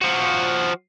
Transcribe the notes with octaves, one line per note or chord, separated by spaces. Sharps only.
F3 F#4